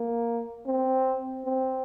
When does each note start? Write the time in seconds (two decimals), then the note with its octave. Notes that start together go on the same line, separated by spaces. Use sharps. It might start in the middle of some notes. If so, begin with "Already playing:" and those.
Already playing: A#3
0.66 C4
1.45 C4